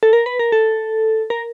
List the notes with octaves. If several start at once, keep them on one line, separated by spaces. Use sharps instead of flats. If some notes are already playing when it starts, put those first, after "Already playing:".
A4
A#4
B4
A#4
A4
A#4